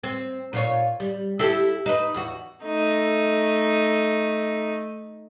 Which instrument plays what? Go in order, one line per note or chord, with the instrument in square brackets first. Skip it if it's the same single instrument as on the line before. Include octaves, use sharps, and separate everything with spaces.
[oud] C4
A#2 F4 C#5
G3
E4 G4 A4
D#4 B4
E2 F#4
[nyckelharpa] A3 D#4